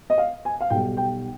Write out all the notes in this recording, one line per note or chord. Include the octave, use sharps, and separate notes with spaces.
D#5
F5
G#5
F5
B1 B2 G3 G5
G5